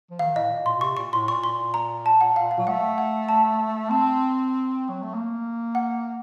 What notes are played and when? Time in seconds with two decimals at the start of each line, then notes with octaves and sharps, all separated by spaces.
0.11 F3
0.19 D#3 F5
0.35 A2 D#5
0.51 A#2
0.66 A#2 C6
0.78 A#2
0.81 C3 C#6
0.97 A#2 C#6
1.13 A2 C6
1.27 A#2 C#6
1.44 C6
1.74 A#5
2.06 A5
2.21 F#5
2.36 F5
2.51 F5
2.58 F#3
2.67 A3 F#5
2.98 F#5
3.29 A5
3.90 C4 A5
4.89 F#3
5.02 A3
5.14 A#3
5.75 F#5